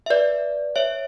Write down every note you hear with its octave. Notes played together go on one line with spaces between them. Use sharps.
E5
B4 D5
C#5 E5